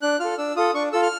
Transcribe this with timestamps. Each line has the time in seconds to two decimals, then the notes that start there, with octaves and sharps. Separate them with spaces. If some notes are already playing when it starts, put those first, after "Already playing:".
0.02 D4 F#6
0.20 F4 A4 F6
0.38 D4 E6
0.56 F4 A4 D#6
0.74 D4 C#6
0.93 F4 A4 E6
1.02 F6